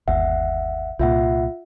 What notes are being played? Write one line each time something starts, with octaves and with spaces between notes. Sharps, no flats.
G1 D#2 E5 F#5
C2 A#2 F4 E5 F#5